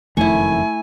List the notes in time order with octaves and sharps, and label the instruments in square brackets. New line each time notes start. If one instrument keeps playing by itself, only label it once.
[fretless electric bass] F#1 F2 D#3 [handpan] A3 [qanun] E4 C#6 [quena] G#5